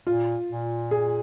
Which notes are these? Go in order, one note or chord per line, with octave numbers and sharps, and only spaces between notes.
A#2 F4
A#2
G#4